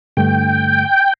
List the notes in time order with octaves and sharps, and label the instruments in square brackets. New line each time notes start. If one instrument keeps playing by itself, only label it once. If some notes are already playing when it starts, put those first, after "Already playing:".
[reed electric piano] G2 D3 A3 [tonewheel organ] G5